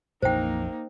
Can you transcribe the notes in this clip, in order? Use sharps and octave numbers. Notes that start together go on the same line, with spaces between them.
A#1 F2 E3 A#3 D#4 C5 G5